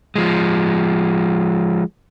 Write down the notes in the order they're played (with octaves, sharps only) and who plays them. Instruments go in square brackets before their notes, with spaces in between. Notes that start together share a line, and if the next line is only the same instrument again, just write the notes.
[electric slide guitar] F3 G#3